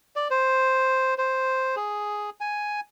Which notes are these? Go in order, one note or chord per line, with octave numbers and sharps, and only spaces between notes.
D5
C5
C5
G#4
G#5